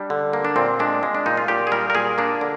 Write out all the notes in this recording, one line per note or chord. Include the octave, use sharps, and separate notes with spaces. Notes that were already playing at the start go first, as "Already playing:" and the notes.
Already playing: G3 D4
D3
A#3
D4
A#2 C4
G#3 D4
G#3
D4
A#2 D#4
F4
A#2 G4
G#4
G3 A#4
A#4
A#2 G#4
A#3 D4
D3